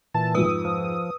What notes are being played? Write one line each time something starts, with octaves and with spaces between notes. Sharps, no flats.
A#2 E3 A5
F2 G#2 B4 D#6 E6
F3